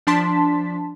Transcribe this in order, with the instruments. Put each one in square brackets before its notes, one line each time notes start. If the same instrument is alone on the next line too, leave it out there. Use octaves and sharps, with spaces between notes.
[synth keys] F3 D4 A5 C6 B6